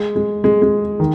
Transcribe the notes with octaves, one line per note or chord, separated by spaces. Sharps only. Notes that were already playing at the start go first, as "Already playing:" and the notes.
Already playing: G#3
G#3
G#3
G#3
D#3